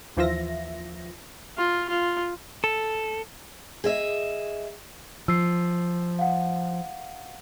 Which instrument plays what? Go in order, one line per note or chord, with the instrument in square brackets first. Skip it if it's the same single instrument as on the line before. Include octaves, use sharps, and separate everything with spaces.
[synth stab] D#2 E3 F3 F4 E5 A#6
[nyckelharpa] F4
F4
[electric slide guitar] A4
[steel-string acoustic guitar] G#4 D#5 E5
[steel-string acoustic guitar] F3 [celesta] E6 C7
[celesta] F5 F#5